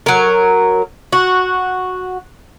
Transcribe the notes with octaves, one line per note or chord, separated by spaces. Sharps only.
F#3 A#4
F#4